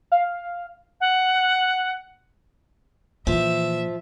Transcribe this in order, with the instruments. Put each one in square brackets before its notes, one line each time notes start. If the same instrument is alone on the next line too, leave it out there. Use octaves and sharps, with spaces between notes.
[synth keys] F5
[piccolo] F#5
[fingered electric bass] A#2 [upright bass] E3 [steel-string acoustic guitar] F3 [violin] E5